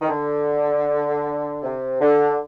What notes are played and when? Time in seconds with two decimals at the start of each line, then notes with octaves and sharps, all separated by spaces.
0.02 D#3
0.09 D3
1.63 C3
2.01 D3